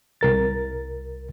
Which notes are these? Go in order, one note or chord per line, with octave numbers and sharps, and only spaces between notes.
C2 A#4 A6